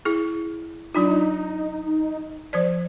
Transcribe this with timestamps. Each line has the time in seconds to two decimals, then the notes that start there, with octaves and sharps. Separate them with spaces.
0.05 E4 G#4
0.95 F#3 D4 D#4 F4
2.53 F3 C5 D5